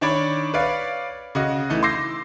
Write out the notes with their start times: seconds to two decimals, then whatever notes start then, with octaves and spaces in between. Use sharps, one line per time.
0.01 D#3 D4 C#5 D5 B5
0.54 B4 C#5 D5 F5
1.35 C#3 F#4 D#5
1.70 E3 A3 D#4
1.83 C6 D6 E6 G6 A#6 C7